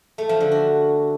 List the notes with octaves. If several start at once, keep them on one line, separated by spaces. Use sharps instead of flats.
A3
F3
D3
F#4